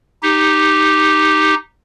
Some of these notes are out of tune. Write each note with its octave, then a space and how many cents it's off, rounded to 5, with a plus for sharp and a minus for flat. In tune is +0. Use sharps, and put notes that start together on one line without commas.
D#4 +0 G4 +5